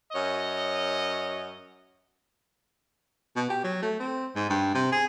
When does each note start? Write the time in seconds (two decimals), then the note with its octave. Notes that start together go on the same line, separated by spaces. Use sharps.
0.12 F#2 C#5 D#5
3.36 B2
3.50 G4
3.64 F#3
3.82 A3
4.00 C4
4.35 G#2
4.50 G2
4.74 C3
4.92 G#4